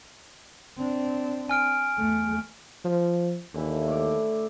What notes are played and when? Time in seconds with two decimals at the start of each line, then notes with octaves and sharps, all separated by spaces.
0.78 C4 D4
1.49 G#5 F6 D7
1.98 E2 A3
2.85 F3
3.54 D#2 D3 E3 E4
3.88 A2 D3 D5